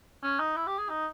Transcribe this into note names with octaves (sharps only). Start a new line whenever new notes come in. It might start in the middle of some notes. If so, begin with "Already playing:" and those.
C#4
D#4
E4
G4
G#4
D#4